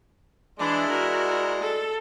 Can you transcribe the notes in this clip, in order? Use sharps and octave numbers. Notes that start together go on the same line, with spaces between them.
E3 G#3 D4 E4 D5
F#4 A#4
A4